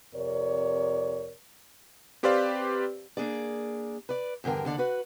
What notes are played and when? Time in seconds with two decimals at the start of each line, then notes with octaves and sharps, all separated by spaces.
0.15 F2 C3 A#4 C#5 D5
2.23 C4 G4 B4 C5 D5 F5
3.17 A#3 D4 G#4 D5
4.09 B4 D5
4.44 E2 G2 D3 A#4 G5
4.65 D#2 D3 D5
4.78 F#4 B4